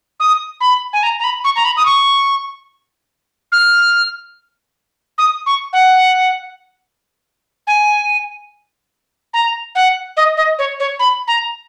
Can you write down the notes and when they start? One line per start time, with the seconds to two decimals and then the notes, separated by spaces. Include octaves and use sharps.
0.20 D#6
0.61 B5
0.93 G#5
1.03 A#5
1.19 A#5
1.24 B5
1.44 C#6
1.56 A#5
1.65 B5
1.77 D#6
1.86 C#6
3.52 F6
5.18 D#6
5.46 C#6
5.73 F#5
7.67 G#5
9.34 A#5
9.75 F#5
10.17 D#5
10.37 D#5
10.59 C#5
10.80 C#5
10.99 B5
11.28 A#5